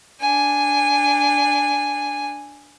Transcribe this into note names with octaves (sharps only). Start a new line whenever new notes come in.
D4 G#5